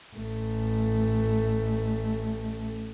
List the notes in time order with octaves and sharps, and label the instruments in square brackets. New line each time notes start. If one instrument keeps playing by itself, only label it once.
[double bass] A1 A3